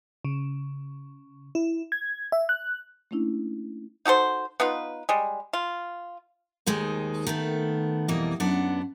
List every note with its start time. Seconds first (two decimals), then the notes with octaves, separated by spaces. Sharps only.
0.25 C#3
1.55 E4
1.92 G#6
2.32 E5
2.49 F#6
3.11 A3 A#3 C#4 D4 E4
4.05 D#4 F#4 A4 C5
4.60 B3 D#4 F4 B4
5.09 G3 G#3
5.53 F4
6.66 D#2 D#3 G#3 D#4 C5
7.27 D#3 A3 B3
8.08 F2 B2 E3 G3 A#3 D#5
8.40 F#2 B3 D4 F#5